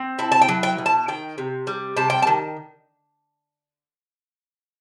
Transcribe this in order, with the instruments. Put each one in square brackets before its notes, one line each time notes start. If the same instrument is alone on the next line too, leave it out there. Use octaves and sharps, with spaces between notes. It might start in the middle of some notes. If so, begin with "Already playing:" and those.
Already playing: [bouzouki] C4
E4 A5
A5
G5
F#3
G5
B2
A5
D#3 G5
C3
G3
C3 A5
G5
A5
D#3